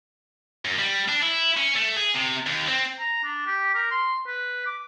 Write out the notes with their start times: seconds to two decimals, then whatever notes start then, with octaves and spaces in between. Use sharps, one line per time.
0.65 F#2
0.79 G3
1.08 D4
1.23 E4
1.57 C#4
1.76 A3
1.97 G#4
2.14 C3
2.47 D#2
2.68 C4
2.99 A#5
3.24 D4
3.47 G4
3.75 A#4
3.91 C6
4.27 B4
4.66 D6